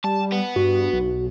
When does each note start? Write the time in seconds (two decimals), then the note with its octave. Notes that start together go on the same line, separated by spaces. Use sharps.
0.04 G3 A5
0.32 B3
0.56 G2 F#4
0.93 B1